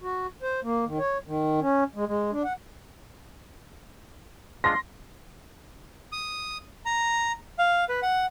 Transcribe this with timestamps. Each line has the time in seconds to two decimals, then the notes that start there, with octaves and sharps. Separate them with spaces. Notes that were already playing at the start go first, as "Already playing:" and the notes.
0.01 F#4
0.43 C5
0.63 A#3
0.86 D#3
0.99 C#5
1.27 D#3
1.61 C#4
1.95 G#3
2.07 G#3
2.32 D4
2.44 F#5
4.64 G#3 D4 F4 C6 A#6
6.12 D#6
6.85 A#5
7.58 F5
7.89 B4
8.02 F#5